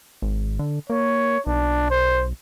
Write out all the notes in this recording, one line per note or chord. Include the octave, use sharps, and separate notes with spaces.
G#1
D3
A#3 C#5
B1 D4
C5